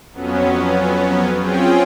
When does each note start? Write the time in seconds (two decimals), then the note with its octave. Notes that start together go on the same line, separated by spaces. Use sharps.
0.12 F2 F#3 B3 C#4
1.36 C4 C#4 F4 G#4 G5